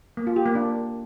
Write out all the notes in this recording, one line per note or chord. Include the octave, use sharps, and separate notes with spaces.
A#3
F4
G4
A#3
D4